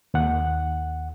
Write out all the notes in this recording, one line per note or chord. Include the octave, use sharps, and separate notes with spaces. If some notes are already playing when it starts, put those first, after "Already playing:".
D#2 F#5